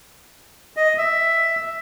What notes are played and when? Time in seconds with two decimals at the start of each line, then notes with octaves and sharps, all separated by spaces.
0.77 D#5
0.98 E5